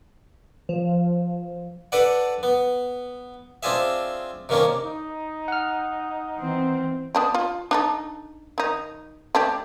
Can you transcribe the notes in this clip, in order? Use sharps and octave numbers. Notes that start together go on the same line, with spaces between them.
F3
D4 A4 B4 D5 F#5
B3
C4 D4 F4 G#4 E5
C3 D#3 A#3 C#4 D4
D#4
F#5 F6
E3 C4
B3 D4 G4
F4
D4 D#4 A4
D#3 D#4
A3 D4 G4